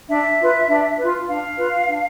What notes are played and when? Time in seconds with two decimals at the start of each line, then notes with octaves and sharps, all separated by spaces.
0.09 D4 E5
0.39 F4 B4
0.69 D4
0.98 F4 B4
1.28 D4 F5
1.58 F4 B4
1.87 D4